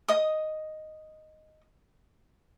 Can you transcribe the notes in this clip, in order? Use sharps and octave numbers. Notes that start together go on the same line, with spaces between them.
D#5 D#6